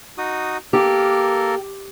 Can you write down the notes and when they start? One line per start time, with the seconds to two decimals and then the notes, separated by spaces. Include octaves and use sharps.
0.18 D#4 F#4 D#6
0.73 A#3 G4 A4 A#4